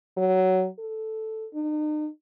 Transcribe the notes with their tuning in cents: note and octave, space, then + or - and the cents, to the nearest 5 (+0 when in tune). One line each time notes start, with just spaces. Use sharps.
F#3 +15
A4 +0
D#4 -40